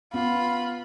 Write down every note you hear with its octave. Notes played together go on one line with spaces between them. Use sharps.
B3 F4 B5